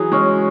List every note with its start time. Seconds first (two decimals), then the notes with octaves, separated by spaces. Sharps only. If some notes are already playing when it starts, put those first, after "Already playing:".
Already playing: E3 F#3 G#4
0.12 G#3 C#4